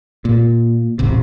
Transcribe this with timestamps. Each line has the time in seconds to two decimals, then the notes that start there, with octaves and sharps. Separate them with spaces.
0.25 A#2
0.99 D#1 A1 C3